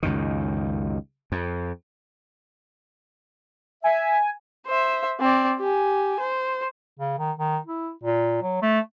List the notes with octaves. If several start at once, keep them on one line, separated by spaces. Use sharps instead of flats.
C#2 F#2 D#3
F2
E5 G#5
C5 E5
C4 D5
G4 G#5
C5
C#3
D#3
D#3
E4
A#2
F#3
A3